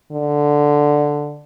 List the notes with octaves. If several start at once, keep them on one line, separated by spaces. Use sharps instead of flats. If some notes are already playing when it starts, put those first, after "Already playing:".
D3